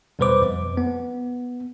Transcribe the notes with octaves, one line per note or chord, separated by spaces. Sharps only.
E2 B2 G3 B4 C5 D6
F2
B3